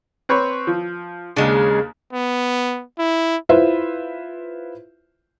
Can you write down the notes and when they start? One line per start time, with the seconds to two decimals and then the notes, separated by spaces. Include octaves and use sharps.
0.29 C4 B4 C#5
0.67 F3
1.36 D#2 C#3 G#3 D4
2.13 B3
2.98 E4
3.49 E4 F4 B4 C5 E5